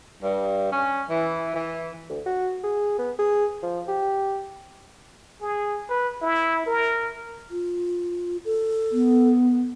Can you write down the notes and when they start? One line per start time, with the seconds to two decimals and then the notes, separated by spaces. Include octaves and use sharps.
0.22 G2
0.71 C#4
1.10 E3
1.54 E3
2.09 D2
2.26 F#4
2.64 G#4
2.99 B3
3.19 G#4
3.63 F3
3.88 G4
5.41 G#4
5.90 B4
6.22 E4
6.66 A#4
7.51 F4
8.45 A4
8.92 B3